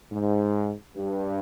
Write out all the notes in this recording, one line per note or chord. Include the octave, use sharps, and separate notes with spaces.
G#2
G2